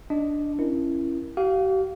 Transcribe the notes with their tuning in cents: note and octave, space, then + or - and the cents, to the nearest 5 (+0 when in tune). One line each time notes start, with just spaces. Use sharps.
D4 +0 D#5 +0
C#4 -15 E4 +15 A#4 +10
G4 -45 F5 +0